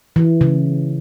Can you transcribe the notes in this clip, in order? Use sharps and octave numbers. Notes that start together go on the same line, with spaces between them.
E3
C#3